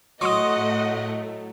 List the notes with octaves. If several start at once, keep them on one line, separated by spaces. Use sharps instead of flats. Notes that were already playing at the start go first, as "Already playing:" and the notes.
A2 F#3 A3 D#5 F#5 C6 C#6 D#6